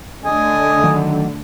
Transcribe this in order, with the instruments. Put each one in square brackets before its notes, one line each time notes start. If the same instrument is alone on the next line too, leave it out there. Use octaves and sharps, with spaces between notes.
[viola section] D3 A3 [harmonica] D#5 G#5
[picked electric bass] D#3 F#3